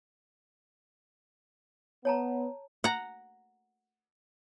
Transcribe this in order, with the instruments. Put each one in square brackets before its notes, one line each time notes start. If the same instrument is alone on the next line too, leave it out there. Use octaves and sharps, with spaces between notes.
[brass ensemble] B3 [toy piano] C#5 A5 A#5
[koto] F#5 A#5